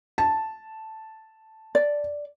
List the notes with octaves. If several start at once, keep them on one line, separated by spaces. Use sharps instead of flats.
A5
D5